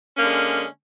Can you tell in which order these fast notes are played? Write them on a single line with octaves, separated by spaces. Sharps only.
C#4 A#3 D3 G#3